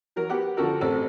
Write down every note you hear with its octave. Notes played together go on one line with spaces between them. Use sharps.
E3 F#3 A#4
B3 G4 F#5
D3 F3 F#4 A4 A#4
A1 F#3 C4 A4